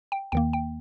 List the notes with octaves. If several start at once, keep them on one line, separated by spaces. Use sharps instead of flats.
G5
D#2 D#3 A#3 G5
G5